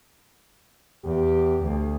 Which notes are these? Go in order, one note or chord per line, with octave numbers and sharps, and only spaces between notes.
E2 G4
D2